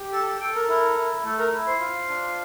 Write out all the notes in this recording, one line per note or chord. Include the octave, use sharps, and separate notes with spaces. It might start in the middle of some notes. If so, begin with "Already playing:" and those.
Already playing: G4
A4 A5
A5
A4 G5
A#4
E4 A#4
E4
A3 A4
A#4
E4
C5
F4
D4